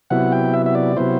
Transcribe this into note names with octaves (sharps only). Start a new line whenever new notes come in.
C3 F#3 B3 E4 F#5
G5
E5
E5
D5
C3 F#3 B3 E4 C5